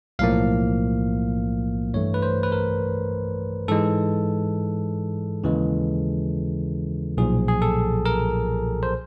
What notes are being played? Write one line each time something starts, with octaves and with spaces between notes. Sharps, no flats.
B1 A2 F3 A#3 F5
G2 E3 A3 C#5
B4
C5
B4
A#4
G#2 E3 G#3 A4
D#2 C#3 E3 G#3
B1 A#2 F3 G#4
G#4
A4
A#4
C5